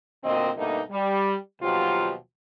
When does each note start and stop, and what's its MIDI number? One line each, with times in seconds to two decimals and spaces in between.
0.24 0.50 38
0.24 0.50 46
0.24 0.50 51
0.24 0.50 60
0.24 0.50 75
0.57 0.81 43
0.57 0.81 47
0.57 0.81 57
0.57 0.81 58
0.57 0.81 63
0.91 1.36 55
1.62 2.13 39
1.62 2.13 47
1.62 2.13 53
1.62 2.13 54
1.62 2.13 65
1.62 2.13 67